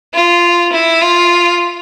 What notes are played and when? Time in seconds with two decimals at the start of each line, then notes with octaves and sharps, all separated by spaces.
0.14 F4
0.72 E4
1.01 F4